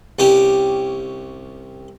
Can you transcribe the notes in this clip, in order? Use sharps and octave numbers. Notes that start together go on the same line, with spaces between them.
C2 C#4 G4